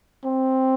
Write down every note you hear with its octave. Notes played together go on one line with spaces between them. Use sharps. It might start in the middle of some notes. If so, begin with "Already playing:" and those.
C4